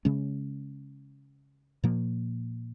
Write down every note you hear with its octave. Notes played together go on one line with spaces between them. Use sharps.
C#3 G#3 C#4
A#2 F3 A#3